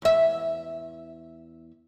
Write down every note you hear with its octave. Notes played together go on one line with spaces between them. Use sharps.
E2 E5